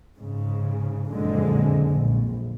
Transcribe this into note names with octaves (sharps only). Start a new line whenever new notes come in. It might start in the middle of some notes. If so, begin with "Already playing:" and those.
G#2 C#3
F#1 F2 A#2 D3 G#3
A#1